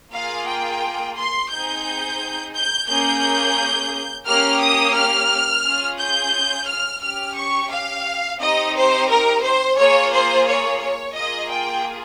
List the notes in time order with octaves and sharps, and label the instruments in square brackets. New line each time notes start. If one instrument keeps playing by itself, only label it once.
[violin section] A#3 F4 G#4 F5
G5
C6
C4 D#4 G#4 G6
G6
A#3 C#4 G#4 G6
A#3 C#4 G4 F6
D#6
F6
C#4 F4 G#4
G6
F6
C#4 G4 F6
C#6
F5
C4 D#4 G4 D#5
C5
A#4
C5
A#3 F4 G#4 C#5
C5
C#5
C#5
A#3 F4 G#4 D#5
G5